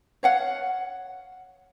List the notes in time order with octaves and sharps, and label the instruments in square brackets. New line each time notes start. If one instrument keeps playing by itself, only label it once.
[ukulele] C#5 F5 F#5